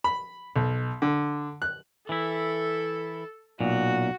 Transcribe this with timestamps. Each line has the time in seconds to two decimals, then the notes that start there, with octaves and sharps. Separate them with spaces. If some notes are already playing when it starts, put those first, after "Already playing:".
0.04 B5
0.56 B1
1.02 D3
1.62 F#6
2.09 E3 E4 A4
3.60 B1 A#2 F#4